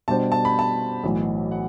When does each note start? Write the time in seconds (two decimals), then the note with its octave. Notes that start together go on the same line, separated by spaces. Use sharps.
0.08 B2 G3 D4 G4 C5 A5
0.32 A5
0.45 B5
0.59 A5
1.03 B1 A2 E3
1.52 F#5